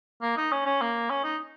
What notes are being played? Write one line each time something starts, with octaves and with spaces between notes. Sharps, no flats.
A#3
D#4
C#4
C#4
A#3
C#4
D#4